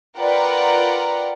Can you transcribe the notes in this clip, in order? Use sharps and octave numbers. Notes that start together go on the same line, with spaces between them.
F4 A#4 B4 D5 F#5 G5